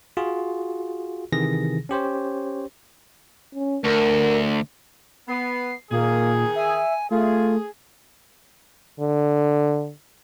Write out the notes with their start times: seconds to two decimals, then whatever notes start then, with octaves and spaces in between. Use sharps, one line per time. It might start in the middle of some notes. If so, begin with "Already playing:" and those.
0.17 F4 F#4 G#4
1.32 C3 D#3 E3 G#4 A#6
1.89 C#4 G4 C5 C#5
3.55 C#4
3.84 D2 A#4
5.28 B3 C7
5.91 A#2 D#3 A#3 G#4
6.56 E5 G#5
7.11 A3 F4 G#4
9.00 D3